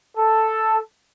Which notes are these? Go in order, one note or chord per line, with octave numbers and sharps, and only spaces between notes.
A4